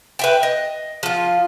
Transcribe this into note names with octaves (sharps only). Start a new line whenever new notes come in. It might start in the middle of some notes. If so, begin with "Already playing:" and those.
B4 E5 G5
D#5
F3 F4